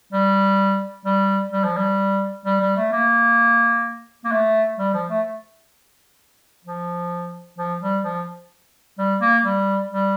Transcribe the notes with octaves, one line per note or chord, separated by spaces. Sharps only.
G3
G3
G3
F3
G3
G3
G3
A3
A#3
A#3
A3
G3
F3
A3
F3
F3
G3
F3
G3
A#3
G3
G3